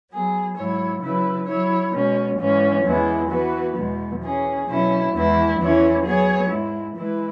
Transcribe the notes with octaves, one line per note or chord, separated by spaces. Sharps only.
F#3 B3 G#4
G#2 F#3 E4 C#5
C#3 F#3 E4 B4
F#3 E4 C#5
B2 G#3 C#4
G#2 E3 C#4
E2 E3 G#3 B3 E4
E3 B3 F#4 B4
E2 B2 G#3 B3
E3 C#4 G#4
B2 F#3 C#4 E4
E2 E3 G#3 E4
E2 E3 C#4 E4 C#5
F#3 B3 G#4 C#5
G#2 G#3 E4
E3 G#3 E4 B4